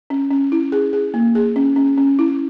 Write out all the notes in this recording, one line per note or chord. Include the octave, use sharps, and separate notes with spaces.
C#4
C#4
E4
G#4
G#4
A#3
G#4
C#4
C#4
C#4
E4